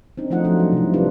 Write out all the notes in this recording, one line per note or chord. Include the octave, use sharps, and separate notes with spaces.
C4 D4 D#4
F3 A3 D#4 F4 F#5
F3 F#3 D4 F4
G3
C3 E4
D4 D#4 F4 G4 B4 D5